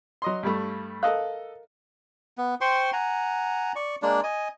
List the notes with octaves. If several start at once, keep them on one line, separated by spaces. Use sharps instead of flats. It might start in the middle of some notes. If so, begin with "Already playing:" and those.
F#3 D#5 C6
G2 G3 A3
A4 A#4 D#5 F5 F#6
B3
C5 G5 C6 C#6
F#5 G#5 A#5
D5 C#6
G#3 A#3 D4 D5
D#5 G#5